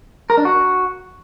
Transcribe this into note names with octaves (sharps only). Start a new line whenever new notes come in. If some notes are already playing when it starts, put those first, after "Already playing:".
A#4
D4
F#4